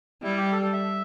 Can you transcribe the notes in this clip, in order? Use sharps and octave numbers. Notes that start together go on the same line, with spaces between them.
G3 E4
G4
A4
A4
E5